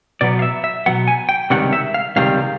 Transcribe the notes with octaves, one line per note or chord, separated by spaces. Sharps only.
B2 F#3 B3 D5
F5
E5
E5
B2 F#3 B3 F#5
G#5
G5
C#2 C3 D#3 G3 F#5
E5
F5
C#2 C3 D#3 G3 F5